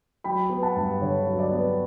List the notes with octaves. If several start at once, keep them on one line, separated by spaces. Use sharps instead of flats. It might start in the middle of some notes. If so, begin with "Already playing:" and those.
F#3 G5 B5
B3
F#5 A5
G2
D3 C#5
F#3
D5
B3